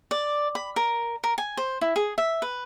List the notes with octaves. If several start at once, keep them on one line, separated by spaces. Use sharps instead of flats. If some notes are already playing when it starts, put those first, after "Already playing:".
D5
B5
A#4
A#4
G#5
C5
E4
G#4
E5
B4